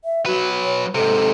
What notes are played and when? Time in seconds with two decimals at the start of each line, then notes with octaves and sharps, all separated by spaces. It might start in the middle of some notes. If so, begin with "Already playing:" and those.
0.04 E5
0.26 F#3 F#4 B4
0.64 C#5
0.95 G#2 C3 A4